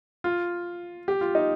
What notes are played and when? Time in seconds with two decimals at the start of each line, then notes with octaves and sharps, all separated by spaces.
0.24 F4
1.08 G4
1.21 F4
1.35 D#4